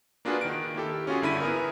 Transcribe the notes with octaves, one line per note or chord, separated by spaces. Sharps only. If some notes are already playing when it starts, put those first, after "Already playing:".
A#3 D4 F4 F#4 G#4 B4
D#3 D7
A#3 E4 G4 A4
C#4 F4 F#4 G#4
G1 D3 E4 B5 B6 D#7
B3 E4 G#4 A#4